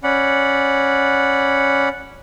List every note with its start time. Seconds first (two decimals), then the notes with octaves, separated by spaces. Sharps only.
0.04 C#4 D5 F#5 B5